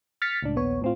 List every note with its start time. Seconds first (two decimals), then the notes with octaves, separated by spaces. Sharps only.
0.22 F6 A6 B6 C#7
0.42 C#2 A2 D4
0.56 A#1 D#2 B3 C#5
0.82 A2 C4 F4